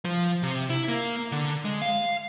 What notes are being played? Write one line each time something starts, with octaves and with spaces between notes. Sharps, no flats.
F3
C3
E4
A#3
D3
G#3
F5